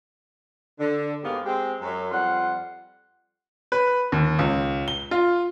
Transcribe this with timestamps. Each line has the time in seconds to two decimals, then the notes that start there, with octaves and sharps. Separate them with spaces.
0.79 D3
1.24 G#2 A#3 B3 G4 F5
1.44 G#3 C4 G4
1.81 F#2 F#3
2.11 F2 G3 F4 F#5
3.72 B4
4.12 D#2
4.39 C#2
4.88 G7
5.11 F4